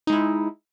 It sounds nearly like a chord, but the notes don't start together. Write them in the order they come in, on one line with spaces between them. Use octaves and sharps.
D#4 G#3 E4